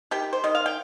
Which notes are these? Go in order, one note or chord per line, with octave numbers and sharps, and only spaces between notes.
D#3 G4 G5
C5
D#3 D#5
F5
G5